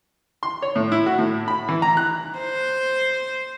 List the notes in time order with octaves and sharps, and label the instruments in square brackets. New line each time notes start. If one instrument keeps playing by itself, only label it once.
[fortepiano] C6
C#5
A2
E4
F#4
A2
B5
E3
A#5
F#6
[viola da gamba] C5